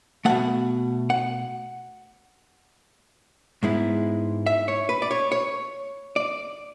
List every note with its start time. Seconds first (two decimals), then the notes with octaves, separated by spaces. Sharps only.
0.25 B2 F#3 A3 F#5
1.10 F#5
3.63 G#2 G#3 B3 E4
4.46 E5
4.68 C#5
4.89 B4
5.02 D5
5.11 C#5
5.32 C#5
6.16 D5